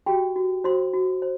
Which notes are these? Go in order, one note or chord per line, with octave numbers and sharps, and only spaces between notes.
F#4 G4 G5
F#4
F#4 C5 C6
F#4
C5